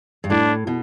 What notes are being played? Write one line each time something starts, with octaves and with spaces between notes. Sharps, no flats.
G2
A2 D4
B2